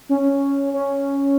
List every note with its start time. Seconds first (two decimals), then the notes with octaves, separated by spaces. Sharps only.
0.09 C#4
0.74 C#4